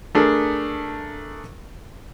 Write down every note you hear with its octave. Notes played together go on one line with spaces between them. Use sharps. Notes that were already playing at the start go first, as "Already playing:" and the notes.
A3 D4 G#4 A#4